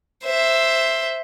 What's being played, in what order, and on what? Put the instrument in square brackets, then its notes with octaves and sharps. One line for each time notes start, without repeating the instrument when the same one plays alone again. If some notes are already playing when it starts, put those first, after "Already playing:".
[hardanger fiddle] C5 E5